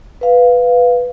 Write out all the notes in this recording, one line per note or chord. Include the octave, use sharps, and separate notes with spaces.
B4 F5